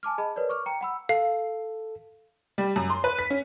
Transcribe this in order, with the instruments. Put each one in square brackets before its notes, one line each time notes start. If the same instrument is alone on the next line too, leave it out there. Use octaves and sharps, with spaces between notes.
[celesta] G#5 A5 D6 F6
G#4 D#5 A5 B5
A#4 B4 C#5 D5
C#6 D6 F6
G5 A#5 C#7
F#5 B5 E6
[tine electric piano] A4 [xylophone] F5
[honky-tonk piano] G3
F#2
C6
B4
B6
C#4